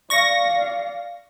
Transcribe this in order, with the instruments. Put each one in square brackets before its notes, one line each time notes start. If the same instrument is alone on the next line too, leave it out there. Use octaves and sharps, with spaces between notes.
[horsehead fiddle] D5 F5 [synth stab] C#6 A#6